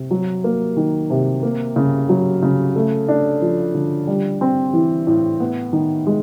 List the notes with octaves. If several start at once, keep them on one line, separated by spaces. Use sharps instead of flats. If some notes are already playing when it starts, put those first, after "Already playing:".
Already playing: C3
F#3
A#3
D#3
C3
A#3
C#3
F#3
C#3
A3
D4
F3
D3
G3
C4
E3
A2
B3
D#3
G#3